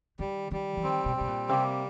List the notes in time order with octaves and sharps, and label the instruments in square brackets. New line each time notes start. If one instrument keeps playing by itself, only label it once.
[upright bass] D#3 [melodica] G3
[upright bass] D#3 [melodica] G3
[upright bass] E3
[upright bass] D#3 [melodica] C4
[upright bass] B2
[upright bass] B2 [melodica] G3
[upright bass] A#2
[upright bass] C3 [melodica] A#3